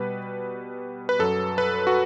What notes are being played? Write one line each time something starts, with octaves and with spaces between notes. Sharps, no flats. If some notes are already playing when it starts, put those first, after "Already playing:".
Already playing: B2 G3 B4
B4
F#2 F#3 A4
B4
F#4